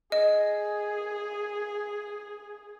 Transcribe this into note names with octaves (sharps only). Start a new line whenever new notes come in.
G#4 D#5